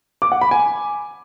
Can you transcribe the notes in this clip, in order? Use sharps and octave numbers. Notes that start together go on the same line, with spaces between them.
D6
F#5
B5
G#5